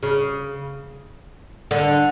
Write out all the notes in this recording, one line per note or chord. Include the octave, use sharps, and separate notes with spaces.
C#3
D3